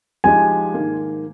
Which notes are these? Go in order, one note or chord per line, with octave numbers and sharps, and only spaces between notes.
F3 G#3 D#4 G4 G#5
G#2 D#3 A#3